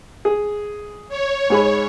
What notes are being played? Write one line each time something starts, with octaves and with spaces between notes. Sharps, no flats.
G#4
C#5
G#2 G#4 B5